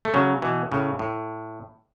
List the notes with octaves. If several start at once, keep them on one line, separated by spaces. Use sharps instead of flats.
A3
C#3 F#3
B2 E3
A2 C#3
A2